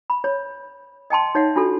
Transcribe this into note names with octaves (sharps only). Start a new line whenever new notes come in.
B5
C#5
D#5 G5 A5 C6
D#4 C#5 E5 F#5
D4 F4 F#4 A4